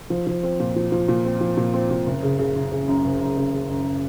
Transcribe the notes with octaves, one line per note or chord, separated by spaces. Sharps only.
F3
F3
C4
A#2
F3
F3
A#2
C4
F3
A#2
C4
A#2
F#1
C#3
C#3
F#1
C#3
F#2
F#1
F#2
C#3
C#3
F#2